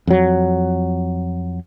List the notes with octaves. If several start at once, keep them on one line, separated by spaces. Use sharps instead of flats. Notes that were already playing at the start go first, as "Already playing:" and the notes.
F2 F#3